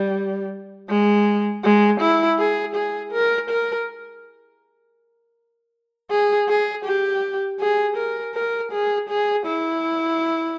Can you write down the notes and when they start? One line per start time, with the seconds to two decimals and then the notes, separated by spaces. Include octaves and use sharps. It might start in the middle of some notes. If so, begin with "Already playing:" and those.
Already playing: G3
0.89 G#3
1.64 G#3
2.01 E4
2.39 G#4
2.76 G#4
3.12 A#4
3.50 A#4
6.11 G#4
6.49 G#4
6.85 G4
7.60 G#4
7.97 A#4
8.35 A#4
8.72 G#4
9.09 G#4
9.46 E4